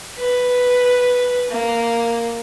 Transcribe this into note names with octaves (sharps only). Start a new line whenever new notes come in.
B4
A#3